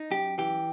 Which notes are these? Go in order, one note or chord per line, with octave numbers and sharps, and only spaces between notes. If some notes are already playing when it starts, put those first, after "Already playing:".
Already playing: D#4
F#2 G4
E3 G4